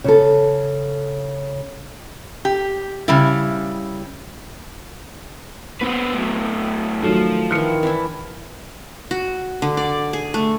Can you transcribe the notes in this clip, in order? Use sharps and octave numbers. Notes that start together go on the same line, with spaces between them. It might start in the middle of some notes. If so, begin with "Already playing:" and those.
C#3 A4
G4
C#3 G3 E4
B3 C4 B4
A2 F#3
D#3 F3 F#3 A3
D#3 E3 F6 C#7
E3 D4 E4
F#4
D3
D5
G#4
A3